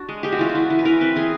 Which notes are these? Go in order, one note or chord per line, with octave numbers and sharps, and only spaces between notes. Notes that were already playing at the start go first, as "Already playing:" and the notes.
Already playing: D4 F#4
G#3
G#3 G4
F#4
E3 F4
F#4
E3
E3
B4
E3 A#4
C4 B4
E3 G#4